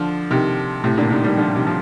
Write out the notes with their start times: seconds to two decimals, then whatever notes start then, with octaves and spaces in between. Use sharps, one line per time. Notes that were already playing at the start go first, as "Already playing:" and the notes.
Already playing: D3 F3
0.30 C3 D#3
0.83 A2 C3
0.97 A#2 D3
1.10 C3 D#3
1.24 D#3 G3
1.37 D3 F3
1.55 C3 D#3
1.67 F3